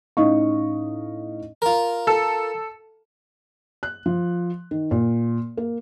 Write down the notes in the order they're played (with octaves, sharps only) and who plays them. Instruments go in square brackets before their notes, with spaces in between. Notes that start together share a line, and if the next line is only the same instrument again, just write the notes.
[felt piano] A2 C#4 D#4 D#5 F5 C#6
[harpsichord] F4 A#4
[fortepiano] A4
[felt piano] F#6
F3
D#3
A#2
A#3